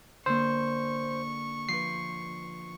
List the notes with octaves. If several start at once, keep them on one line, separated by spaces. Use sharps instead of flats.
D3 A#3 C5 C#6
F3 B4 C7